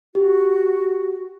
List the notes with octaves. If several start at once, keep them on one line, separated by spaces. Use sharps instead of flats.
F#4 G4